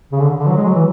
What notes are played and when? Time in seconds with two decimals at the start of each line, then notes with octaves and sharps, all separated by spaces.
0.12 C#3
0.21 D3
0.39 D3
0.47 F#3
0.57 G#3
0.65 F#3
0.75 E3